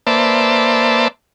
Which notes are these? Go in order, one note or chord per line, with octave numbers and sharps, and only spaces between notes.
A#3 B4 C5 D5 E5 A5